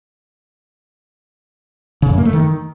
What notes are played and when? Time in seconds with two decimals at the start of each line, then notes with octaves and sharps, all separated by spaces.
2.02 C#3
2.10 F#2
2.18 A#3
2.25 A3
2.33 D#3